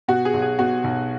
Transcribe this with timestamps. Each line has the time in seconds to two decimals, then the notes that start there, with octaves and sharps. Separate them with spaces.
0.08 B2 F#4
0.25 G#4
0.34 B1
0.42 G#4
0.59 B2 F#4
0.84 B1